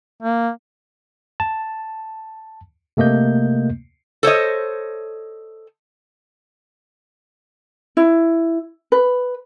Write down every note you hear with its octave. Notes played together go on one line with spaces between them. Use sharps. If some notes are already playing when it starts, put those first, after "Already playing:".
A#3
A5
C3 A3 A#3 D#5 G6
A4 C5 C#5 D#5
E4
B4